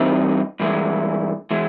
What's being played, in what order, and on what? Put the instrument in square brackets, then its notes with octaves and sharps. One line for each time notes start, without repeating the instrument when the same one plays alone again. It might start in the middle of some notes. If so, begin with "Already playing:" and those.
Already playing: [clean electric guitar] G2 E3 G3 C4 D#4
G2 E3 G#3
E3 G#3